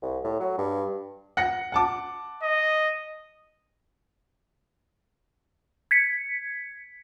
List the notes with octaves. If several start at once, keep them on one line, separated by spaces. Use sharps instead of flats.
C2
A2
F#3
G2
F#5 A#6 C#7
F#5 A5 D6
D#5
G#6 B6 C#7